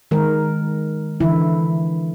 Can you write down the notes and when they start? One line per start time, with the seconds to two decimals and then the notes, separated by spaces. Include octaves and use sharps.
0.11 D#3 G#3 A#4
1.20 D3 E3 E4